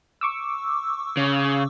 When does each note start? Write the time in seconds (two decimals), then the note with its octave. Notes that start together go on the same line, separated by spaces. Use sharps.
0.21 C#6 D6 E6
1.17 C#3